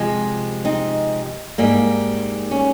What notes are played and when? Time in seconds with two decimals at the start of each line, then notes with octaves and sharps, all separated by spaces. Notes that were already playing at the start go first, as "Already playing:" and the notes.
Already playing: C3 F3 G#3
0.65 C4 D#4
1.58 G#2 G3 A#3
2.51 C#4